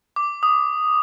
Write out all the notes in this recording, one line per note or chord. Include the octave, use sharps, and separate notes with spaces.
D6
D#6